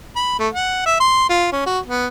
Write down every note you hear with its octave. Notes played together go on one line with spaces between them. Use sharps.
B5
A3
F#5
E5
C6
F4
C#4
F#4
B3